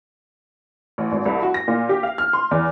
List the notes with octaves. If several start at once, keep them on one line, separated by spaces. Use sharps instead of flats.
A1
G#1
C2
F#4
A#6
A#2
G4
F5
F6
C6
E2